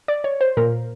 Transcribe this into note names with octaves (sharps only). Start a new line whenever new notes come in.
D5
C#5
C5
A#2 A#4